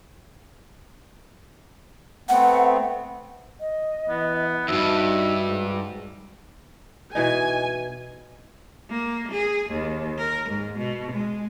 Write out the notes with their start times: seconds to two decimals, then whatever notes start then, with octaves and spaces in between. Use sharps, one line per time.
2.29 A3 B3 C4 F#5
3.60 D#5
4.09 E3 B3
4.68 E2 G2 D#4 F#4 E5
5.47 G#2
7.15 B2 E3 D#4 G#5
8.90 A#3
9.32 G#4
9.70 D#2
10.18 A#4
10.49 G#2
10.79 B2
11.12 G#3